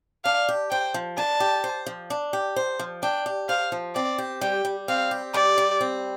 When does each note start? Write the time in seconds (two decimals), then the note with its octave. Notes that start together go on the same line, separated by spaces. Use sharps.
0.25 D4 F5
0.48 G4
0.71 C5 G5
0.94 F3
1.17 D4 A5
1.40 G4
1.64 C5
1.86 F3
2.10 D4
2.33 G4
2.56 C5
2.79 F3
3.03 D4 G5
3.26 G4
3.49 C5 F5
3.72 F3
3.95 C4 D5
4.18 G4
4.41 G3 G5
4.65 G3
4.88 C4 F5
5.11 G4
5.34 G3 D5
5.58 G3
5.81 C4